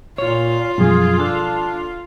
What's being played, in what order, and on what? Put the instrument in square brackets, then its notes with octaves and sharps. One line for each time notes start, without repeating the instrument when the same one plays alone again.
[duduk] A#2 [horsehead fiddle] F4 [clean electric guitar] C#5
[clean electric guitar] F#2 [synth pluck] B2 F3 G3 [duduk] G#4
[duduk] D4 [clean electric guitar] A4